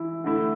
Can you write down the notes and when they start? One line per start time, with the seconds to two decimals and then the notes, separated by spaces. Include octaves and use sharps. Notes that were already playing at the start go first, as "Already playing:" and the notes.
Already playing: E3 E4
0.24 D3 A3 E4